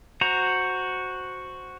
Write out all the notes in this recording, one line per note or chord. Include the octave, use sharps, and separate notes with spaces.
F#4 C5 A#5